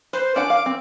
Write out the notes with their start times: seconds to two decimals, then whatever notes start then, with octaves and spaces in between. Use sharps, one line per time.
0.13 B4 C5
0.36 C#4 D4 F#5 D6
0.50 F5
0.66 C4